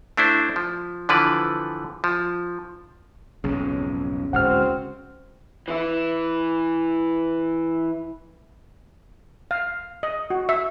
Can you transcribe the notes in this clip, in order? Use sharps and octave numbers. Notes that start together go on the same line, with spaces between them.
A3 D4 E4 C5
F3
D3 E3 F3 B4 D5
F3
B1 F2 G#2 C#3
D1 C#2 G#2 C4 F#4 C5 F#5 F6
E3 E4
F5
D#5
F#4
E5